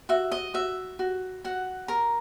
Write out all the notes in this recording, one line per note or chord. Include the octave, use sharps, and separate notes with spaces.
F#4 E5
D#5
F#4 E5
F#4
F#4 F#5
A#4 A#5